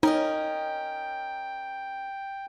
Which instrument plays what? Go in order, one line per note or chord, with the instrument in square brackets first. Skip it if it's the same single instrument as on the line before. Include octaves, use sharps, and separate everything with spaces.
[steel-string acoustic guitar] C#4 A#4 D#5 [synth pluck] D#4 [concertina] G5